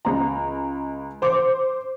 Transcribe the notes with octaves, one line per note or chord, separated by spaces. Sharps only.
C#2 A#5
C5 D6